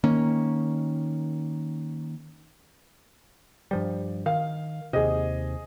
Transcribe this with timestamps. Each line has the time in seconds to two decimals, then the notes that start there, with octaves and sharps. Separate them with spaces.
0.04 D#3 A#3 C#4
3.71 G2 F3 G3
4.26 D#3 F5
4.93 D#2 C3 G#4 D#5